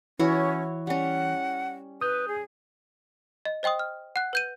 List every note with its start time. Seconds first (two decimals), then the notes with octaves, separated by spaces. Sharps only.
0.19 E3 C#4 E4 F#4 C#5
0.87 G3 C#4 F#5
2.01 B4 D#6 G6
2.28 G#4
3.45 D#5
3.63 C5 D#5 G5 C6 D#6
3.79 F6
4.16 F#5 F#6
4.33 B4 G6 D#7